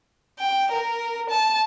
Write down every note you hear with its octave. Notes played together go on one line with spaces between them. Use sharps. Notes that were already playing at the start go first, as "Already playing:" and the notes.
G5
A#4
A5